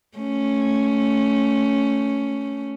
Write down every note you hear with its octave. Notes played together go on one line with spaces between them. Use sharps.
A3 C#4